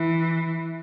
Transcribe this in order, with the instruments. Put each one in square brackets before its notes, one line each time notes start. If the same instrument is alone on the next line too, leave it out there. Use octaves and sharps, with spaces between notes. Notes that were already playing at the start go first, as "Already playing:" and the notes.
Already playing: [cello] E3